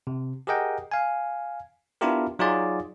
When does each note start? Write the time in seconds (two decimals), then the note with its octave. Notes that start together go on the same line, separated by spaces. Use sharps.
0.07 C3
0.47 G4 G#4 A#4 D#5 F#5 G5
0.91 F5 G#5
2.01 B3 D4 E4 F4 G4 A#4
2.39 F#3 D#4 F4 F#4 G#4 D5